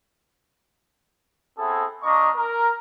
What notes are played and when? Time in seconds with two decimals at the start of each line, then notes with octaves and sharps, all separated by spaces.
1.58 B3 C4 E4 G#4 A4
2.02 A#3 D4 A#4 D#5 C#6
2.35 A#4